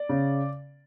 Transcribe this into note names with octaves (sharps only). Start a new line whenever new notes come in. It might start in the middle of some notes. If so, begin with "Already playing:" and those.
Already playing: D5
C#3